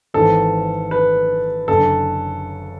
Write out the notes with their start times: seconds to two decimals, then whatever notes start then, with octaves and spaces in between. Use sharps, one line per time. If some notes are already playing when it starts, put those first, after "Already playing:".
0.14 G#1 G#2 E3 A4
0.91 B4
1.68 F#1 F#2 D3 A4